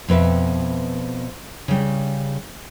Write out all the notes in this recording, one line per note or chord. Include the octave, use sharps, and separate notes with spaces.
F2 B2 B4 E5
C#3 G3